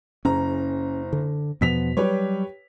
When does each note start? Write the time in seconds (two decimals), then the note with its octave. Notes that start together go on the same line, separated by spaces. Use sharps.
0.25 F#1 C#4 A#5
1.13 D3
1.61 E2 B2 F3 B3 B6 F7
1.97 F#3 G3 G4 B4 C#5